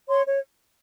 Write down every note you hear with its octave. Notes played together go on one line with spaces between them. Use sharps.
C#5 C6
C#5